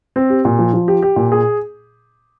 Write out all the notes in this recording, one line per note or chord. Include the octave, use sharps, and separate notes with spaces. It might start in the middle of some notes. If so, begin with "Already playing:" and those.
C4
G4
A#2
F3
F3
G4
G4
A#2
G#4